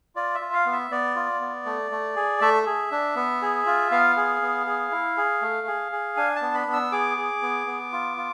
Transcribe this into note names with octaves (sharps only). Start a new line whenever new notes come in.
F4 D5
E5
F4
F5
B3
E5
B3 D5
F4
B3
A3
A3
G#4
A3 E5
G#4
D4
B3
G#4
F4
B3 F5
G#4
B3
G#4
E4
G#4
A3
G#4
G#4
D4 G#5
A5
B3
B5
B3
E6
G#4 D6
G#4
B3
B3
F4
F4